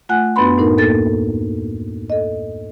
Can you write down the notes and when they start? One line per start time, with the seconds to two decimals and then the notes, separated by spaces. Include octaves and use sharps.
0.09 A3 F4 F#5 G#5 F#6
0.36 F#2 B3 D4 B4 B5 C6
0.58 A2 D#4 A#4
0.77 D#2 A#3 A4 A6
2.10 A4 D#5